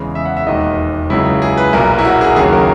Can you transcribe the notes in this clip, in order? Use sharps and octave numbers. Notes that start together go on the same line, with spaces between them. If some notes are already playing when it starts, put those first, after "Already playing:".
Already playing: E2 C#3 G#3
E5
F#5
E5
E1 D#2 D#3 D#5
C#2 C#3 F#3 E4
G#4
B4
B1 A#2 F#3 A#4
E4
F#4
G#4
D#2 C#3 F#3 G#4
A#4